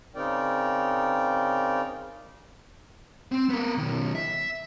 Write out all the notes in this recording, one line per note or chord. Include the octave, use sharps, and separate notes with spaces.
C#3 C4 D#4 A#4 D5 G5
C4
B3 A#4
B2 D#3
E5